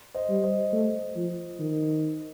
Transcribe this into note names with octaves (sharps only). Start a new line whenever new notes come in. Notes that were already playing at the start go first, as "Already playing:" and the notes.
C5 D#5
G3
C5 D#5
A3
F3
D#3